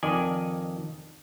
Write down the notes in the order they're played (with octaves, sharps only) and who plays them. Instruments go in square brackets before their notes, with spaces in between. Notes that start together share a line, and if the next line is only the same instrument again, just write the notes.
[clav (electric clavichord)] F2 D#3 D5 D#5 G#5